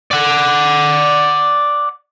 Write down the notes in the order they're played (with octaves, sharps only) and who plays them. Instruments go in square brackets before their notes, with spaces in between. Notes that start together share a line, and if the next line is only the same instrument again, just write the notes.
[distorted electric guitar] D5 F#5